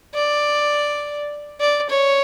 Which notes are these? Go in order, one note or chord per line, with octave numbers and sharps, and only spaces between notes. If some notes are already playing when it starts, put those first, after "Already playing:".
D5
D5
C#5